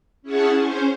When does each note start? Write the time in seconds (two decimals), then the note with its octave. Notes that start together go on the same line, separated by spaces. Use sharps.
0.22 C#4 E4 G#4 C#5 F#5 A5
0.54 C#4 C5